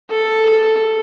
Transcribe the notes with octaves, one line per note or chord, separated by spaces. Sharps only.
A4
A4